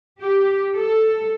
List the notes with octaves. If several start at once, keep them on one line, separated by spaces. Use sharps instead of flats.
G4
A4